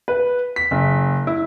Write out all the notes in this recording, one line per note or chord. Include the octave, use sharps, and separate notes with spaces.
B4
B6
F#1
E4